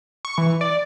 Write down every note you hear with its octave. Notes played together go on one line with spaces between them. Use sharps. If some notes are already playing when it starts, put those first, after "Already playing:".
C#6
E3
D5